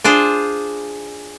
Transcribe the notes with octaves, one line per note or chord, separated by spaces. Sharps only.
D4 F4 G#4 C5